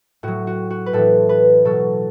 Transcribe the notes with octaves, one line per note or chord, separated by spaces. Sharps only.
A2 F#3 F#4
F#4
F#4
B4
A2 E3 A4
B4
B2 F#3 A4